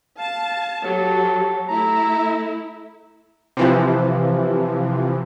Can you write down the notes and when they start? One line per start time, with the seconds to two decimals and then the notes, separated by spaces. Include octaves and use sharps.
0.18 F5 A5
0.83 F#3 G4 A4
1.68 A3 E4 A#5
3.57 C3 E3 F3